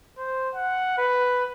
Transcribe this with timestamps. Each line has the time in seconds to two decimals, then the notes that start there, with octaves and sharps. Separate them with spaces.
0.18 C5
0.55 F#5
0.98 B4